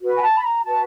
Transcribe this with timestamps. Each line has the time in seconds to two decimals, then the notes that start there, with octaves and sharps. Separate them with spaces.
0.02 F#4 B4
0.18 G#5
0.22 A5
0.36 B5
0.43 A#5
0.64 F#4 B4 A5